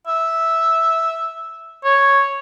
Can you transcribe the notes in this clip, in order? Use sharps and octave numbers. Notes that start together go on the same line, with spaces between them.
E5
C#5